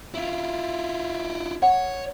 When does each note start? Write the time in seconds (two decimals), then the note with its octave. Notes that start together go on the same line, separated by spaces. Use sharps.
0.14 E4 F4
1.63 C#5 F#5